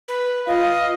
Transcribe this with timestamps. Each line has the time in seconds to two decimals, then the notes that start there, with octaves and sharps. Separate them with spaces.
0.08 B4
0.47 F4 D#5 F5